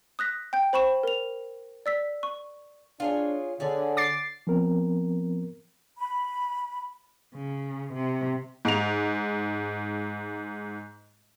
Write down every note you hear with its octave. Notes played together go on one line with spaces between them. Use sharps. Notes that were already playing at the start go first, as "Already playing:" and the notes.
D#6 F#6 A#6 B6
G5 G6
C5 B5 C#6 E7
A#4 F7
D5 E6 B6
C#6
D4 F4 G#4 C#5
D3 C#4 G#4 D5
D6 A6 C7
F3 B3 C4 A#4
B5
C#3
C3
G#2 F7